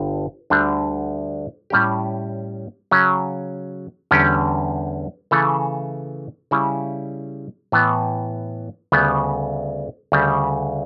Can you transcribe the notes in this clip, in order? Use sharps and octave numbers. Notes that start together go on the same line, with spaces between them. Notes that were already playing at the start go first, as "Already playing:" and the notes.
Already playing: G1 G2 D3 G3
D2 D3 G3 D4
A2 G3 C#4 G4
C#3 F#3 C#4
E2 D3 G3 C#4 G4
C#3 E3 A3 E4 A4
C#3 G3 C#4 E4
A2 E3 B3
D2 C#3 G3 B3
D2 C#3 G3